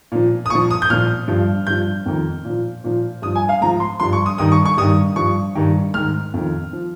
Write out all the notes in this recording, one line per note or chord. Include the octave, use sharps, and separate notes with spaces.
A#2 F3
D#6
A#2 F3 C#6
D#6
G6
A#2 F3 F6
G2 F3
G2 F3 G6
F2 D#3
A#2
F3
A#2 F3
G2 F3 D#6
G#5
F5
G#2 F3 A#5
C6
G2 F3 C6
C#6
D#6
G2 D#3 D#6
C#6
C#6
G2 D#3 D#6
G2 F3 C#6
G2 D#3
G#2 D#3 F6
F2 D#3
F3